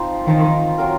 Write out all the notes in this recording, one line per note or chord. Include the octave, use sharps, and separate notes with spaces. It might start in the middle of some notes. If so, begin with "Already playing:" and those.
Already playing: F3 C4 D#4
D#3 F3 C4 F4
F#3 C4 F4 A#4